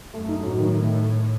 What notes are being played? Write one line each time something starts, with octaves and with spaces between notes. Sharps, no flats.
F#2 A3
D#4
A2 F#3
D#3
A3